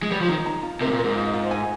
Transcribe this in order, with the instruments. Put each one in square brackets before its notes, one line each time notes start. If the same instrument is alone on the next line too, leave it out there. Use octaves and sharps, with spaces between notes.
[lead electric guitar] G#3
[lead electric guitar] G3 [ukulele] C#5
[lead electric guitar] F3
[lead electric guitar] D#3 [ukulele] D#4
[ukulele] A#5
F4
[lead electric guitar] C3 [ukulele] A#4
[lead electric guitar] G#2
A#2
[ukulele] A#4
[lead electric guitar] G#2
[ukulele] F4
F4
G#5